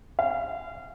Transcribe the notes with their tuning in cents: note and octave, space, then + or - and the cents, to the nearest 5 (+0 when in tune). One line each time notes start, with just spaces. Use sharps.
F5 -30